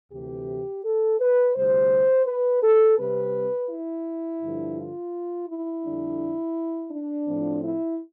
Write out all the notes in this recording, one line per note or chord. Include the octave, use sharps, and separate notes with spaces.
D2 C3 E3 G4
A4
B4
D2 C3 G3 C5
B4
A4
C3 G3 C4 B4
E4
G2 D3 F3
F4
E4
F2 D3 G3 D4
D4
A2 F3 C4
E4